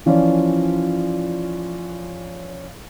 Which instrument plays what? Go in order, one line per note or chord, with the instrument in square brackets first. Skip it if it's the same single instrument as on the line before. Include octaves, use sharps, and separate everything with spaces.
[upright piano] E3 F3 C#4 F4 D5